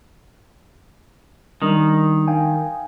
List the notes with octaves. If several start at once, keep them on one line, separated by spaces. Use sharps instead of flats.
D#3 G3 D4
F5 G5 G#5